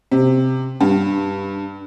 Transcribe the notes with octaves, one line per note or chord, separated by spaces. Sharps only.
C3
G2